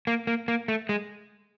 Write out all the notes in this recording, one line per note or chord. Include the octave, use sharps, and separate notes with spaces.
A#3
A#3
A#3
A3
G#3